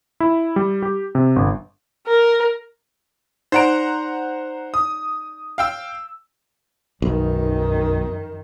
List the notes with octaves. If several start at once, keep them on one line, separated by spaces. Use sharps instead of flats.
E4
G3
G4
C3
G1
A#4
D#4 C5 D5 F#5 A#5 D7
D#6
F5 G5 E6
B1 F#2 D#3